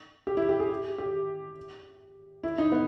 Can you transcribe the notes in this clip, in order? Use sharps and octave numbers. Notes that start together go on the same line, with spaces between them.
G4
E4
G4
G#4
G4
G4
E4
D#4
B3